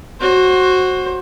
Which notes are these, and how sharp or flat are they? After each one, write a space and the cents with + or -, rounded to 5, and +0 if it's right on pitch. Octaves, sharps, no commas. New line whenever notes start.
F#4 +0 C5 +25